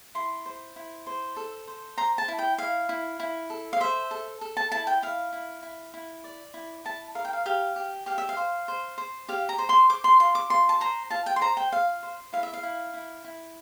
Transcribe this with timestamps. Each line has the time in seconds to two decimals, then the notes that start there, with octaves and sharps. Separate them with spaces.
0.15 E4 C6
0.45 C5
0.76 E4
1.07 C5
1.36 A4
1.67 C5
1.97 C5 A#5
2.18 A5
2.28 E4
2.38 G5
2.58 E4 F5
2.89 E4
3.20 E4
3.50 A4
3.73 F5
3.80 C5 E5
4.11 A4
4.41 A4
4.57 A5
4.72 E4 A5
4.87 G5
5.02 E4 F5
5.33 E4
5.63 E4
5.94 E4
6.24 D5
6.54 E4
6.85 E4 A5
7.15 A#4 F5
7.25 G5
7.33 F5
7.46 G4 F5
7.76 G4
8.06 G4 F5
8.18 E5
8.29 F5
8.37 C5
8.68 C5
8.98 C5
9.28 G4 F5
9.49 A#5
9.58 C5
9.69 C6
9.90 C5 D6
10.04 C6
10.20 F4 C6
10.35 D6
10.50 F4 C6
10.69 A5
10.81 C5 A#5
11.10 F4 A5
11.26 G5
11.36 C6
11.41 C5 A#5
11.57 G5
11.72 F4 F5
12.03 C5
12.33 E4 F5
12.43 E5
12.53 F5
12.63 E4
12.94 E4
13.24 E4